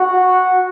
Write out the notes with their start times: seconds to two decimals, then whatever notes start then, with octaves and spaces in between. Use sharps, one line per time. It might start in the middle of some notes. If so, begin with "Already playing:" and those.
Already playing: F#4